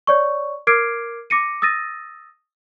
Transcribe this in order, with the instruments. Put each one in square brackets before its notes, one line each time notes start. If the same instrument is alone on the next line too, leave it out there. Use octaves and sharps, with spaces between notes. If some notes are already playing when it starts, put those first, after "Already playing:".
[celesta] C#5 D5 C#6
A#4 D6 F6 G#6 C7 D7
D6 A#6 C#7 D#7
D#6 E6 A6 A#6 D#7